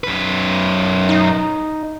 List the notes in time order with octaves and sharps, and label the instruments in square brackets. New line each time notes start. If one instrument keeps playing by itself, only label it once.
[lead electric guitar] F#2 B4
[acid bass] D#4